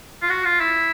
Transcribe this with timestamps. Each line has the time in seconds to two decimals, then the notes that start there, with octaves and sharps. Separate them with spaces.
0.22 F4
0.30 F#4
0.45 F4
0.61 E4